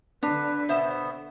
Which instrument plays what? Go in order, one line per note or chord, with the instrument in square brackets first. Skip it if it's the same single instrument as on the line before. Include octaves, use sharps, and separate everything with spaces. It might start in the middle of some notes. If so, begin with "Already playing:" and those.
[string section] D3 [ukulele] D4 [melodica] B4
[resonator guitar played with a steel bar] B2 C5 E5 [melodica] B3